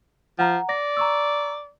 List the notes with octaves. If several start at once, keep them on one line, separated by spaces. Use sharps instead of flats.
F3 F#5 A#5
D5 A#6
A#5 C#6 E6